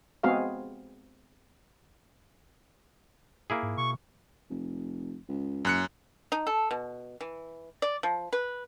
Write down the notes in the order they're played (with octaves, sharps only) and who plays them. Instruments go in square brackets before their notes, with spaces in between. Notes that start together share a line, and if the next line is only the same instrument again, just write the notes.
[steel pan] G#3 B3 C4 F#4 G#4 F5
[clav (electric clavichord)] A#3 E4 G#4
[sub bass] G#2
[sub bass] B2 [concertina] C#6
[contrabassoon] F1
C#2
[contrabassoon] F#1 [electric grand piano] F#2 F#6 C#7
[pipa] D#4
A4
B2
E3
D5
F3
B4